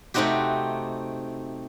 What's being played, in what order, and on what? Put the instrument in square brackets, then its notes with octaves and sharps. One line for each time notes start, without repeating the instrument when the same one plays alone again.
[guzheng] C3 A3 C4 D#4 F#4 G4